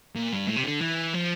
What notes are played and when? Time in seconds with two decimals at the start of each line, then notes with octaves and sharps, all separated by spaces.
0.15 A#2
0.32 G2
0.48 A2
0.57 C3
0.65 D3
0.81 E3
1.14 F3